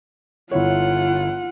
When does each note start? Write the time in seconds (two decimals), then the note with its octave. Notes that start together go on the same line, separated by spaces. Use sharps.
0.51 G1 E4 F4 C#5 F#5